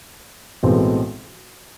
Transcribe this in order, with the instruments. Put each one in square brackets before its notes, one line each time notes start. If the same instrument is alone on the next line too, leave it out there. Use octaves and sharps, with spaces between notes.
[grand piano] B1 A2 E3 G#3 C4